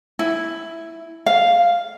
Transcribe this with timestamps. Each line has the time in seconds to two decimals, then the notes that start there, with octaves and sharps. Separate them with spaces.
0.19 E4
1.26 F5